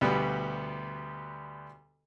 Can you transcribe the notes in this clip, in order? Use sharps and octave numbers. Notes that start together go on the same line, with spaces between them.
D2 B2 G3 B3